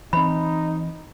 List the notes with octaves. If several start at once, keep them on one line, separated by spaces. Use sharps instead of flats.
E3 C4 D#4 B5